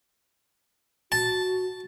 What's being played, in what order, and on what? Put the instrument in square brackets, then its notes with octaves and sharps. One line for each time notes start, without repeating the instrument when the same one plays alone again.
[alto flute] F#4 [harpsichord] A5